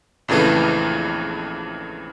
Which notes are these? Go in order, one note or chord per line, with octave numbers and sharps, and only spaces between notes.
A#1 F2 C#3 E3 A3